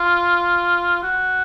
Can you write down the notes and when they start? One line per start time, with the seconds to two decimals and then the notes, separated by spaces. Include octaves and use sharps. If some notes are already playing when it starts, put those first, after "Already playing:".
Already playing: F4
1.03 F#4